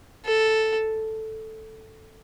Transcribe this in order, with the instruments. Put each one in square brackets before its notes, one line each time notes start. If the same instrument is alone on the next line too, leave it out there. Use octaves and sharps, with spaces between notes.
[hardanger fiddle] A4